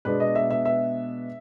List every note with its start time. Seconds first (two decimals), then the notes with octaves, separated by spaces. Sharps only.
0.05 B2 G#3 B3 D4 B4
0.20 D#5
0.35 E5
0.51 E5
0.65 E5